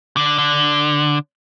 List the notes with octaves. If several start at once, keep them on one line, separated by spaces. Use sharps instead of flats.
D3
D3